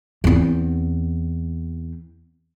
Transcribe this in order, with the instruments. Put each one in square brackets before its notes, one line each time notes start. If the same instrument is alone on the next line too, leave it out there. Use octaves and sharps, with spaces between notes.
[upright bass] E2 C4